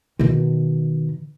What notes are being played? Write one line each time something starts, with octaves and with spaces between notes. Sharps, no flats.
B2 D#3